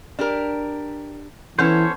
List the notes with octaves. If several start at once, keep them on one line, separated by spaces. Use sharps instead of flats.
D4 G4 A#4
E3 B3 C#4 A4 C5 C#5